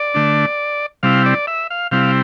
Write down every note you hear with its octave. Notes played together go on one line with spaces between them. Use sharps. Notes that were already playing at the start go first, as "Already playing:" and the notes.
Already playing: D5
D3 A3 D4
C3 G3 C4 E4 F5
D5
E5
F5
C3 G3 C4 E4 F5